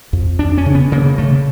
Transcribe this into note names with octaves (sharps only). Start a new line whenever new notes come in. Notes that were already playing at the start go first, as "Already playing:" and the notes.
F2
D#2 D4
C#4
C#3
B3
C#3 A#3
C#3 A3